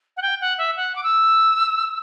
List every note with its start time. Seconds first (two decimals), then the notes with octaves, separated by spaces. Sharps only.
0.17 F#5
0.22 G5
0.41 F#5
0.58 E5
0.76 F#5
0.95 D6
1.03 E6